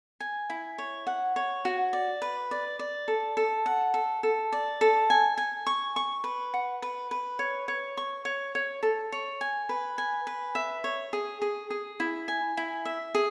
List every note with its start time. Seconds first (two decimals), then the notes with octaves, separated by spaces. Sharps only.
0.20 G#5
0.50 E4
0.78 C#5
1.07 F#5
1.36 C#5
1.65 F#4
1.93 D5
2.22 B4
2.51 D5
2.79 D5
3.08 A4
3.37 A4
3.66 F#5
3.94 A4
4.23 A4
4.52 D5
4.81 A4
5.10 G#5
5.38 G#5
5.67 C#6
5.96 C#6
6.24 B4
6.54 F#5
6.82 B4
7.11 B4
7.39 C#5
7.68 C#5
7.97 C#6
8.25 C#5
8.55 C#5
8.83 A4
9.12 C#5
9.41 G#5
9.69 B4
9.98 G#5
10.27 B4
10.55 E5
10.84 C#5
11.13 G#4
11.42 G#4
11.70 G#4
12.00 E4
12.28 G#5
12.57 E4
12.85 E5
13.15 G#4